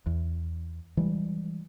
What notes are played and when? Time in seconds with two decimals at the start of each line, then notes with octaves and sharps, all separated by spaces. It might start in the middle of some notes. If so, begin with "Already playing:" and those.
0.06 E2
0.97 E3 G3 G#3